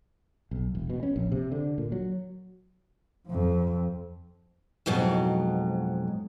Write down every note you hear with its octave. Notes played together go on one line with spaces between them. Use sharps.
B1
E1
B2
C#4
A#1
C3
D3
A#2
F#3
F2 F3
F2 G#2 B2 F#3